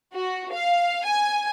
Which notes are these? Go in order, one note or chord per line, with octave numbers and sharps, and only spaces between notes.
F#4
F5
G#5